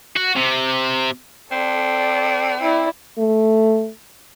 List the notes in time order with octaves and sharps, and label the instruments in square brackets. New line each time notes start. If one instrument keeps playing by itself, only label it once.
[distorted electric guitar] F#4
C3
[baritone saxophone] C4 [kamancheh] A4 D5
[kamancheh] E4 D5
[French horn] A3